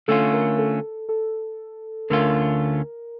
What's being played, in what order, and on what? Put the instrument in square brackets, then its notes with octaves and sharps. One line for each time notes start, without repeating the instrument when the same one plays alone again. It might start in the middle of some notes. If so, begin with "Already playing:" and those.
[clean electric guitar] D3 A3 C#4 F4 [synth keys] A4
[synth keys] A#4
A4
A4
[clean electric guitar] D2 D3 A3 C#4 F4 [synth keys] A#4